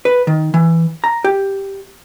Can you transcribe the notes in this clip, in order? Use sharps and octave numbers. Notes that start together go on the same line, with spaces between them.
B4
D#3
E3
A#5
G4